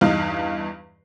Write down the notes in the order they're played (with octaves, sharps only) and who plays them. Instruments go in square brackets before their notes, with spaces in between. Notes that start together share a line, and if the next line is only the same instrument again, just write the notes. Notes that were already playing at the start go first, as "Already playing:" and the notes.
[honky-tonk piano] E2 G2 D#4 F5